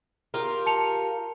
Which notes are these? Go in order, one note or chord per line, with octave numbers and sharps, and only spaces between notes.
F4 G4 A#4
A5 C#7 F7